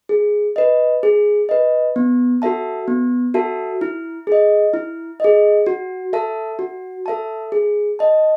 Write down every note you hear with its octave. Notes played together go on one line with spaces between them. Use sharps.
G#4
B4 D#5
G#4
B4 D#5
B3
F#4 A4 E5 A5
B3
F#4 A4 E5 A5
E4
G#4 D#5
E4
G#4 D#5
F#4
A4 E5 A5
F#4
A4 E5 A5
G#4
D#5 A5